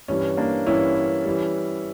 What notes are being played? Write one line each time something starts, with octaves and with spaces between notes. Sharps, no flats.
G2 E3 G3 C#4
A#3 D4
G2 E3 G3 C#4 E4
E3 G3